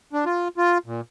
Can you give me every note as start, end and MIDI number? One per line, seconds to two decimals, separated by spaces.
0.13 0.25 62
0.26 0.48 65
0.58 0.78 65
0.86 1.01 46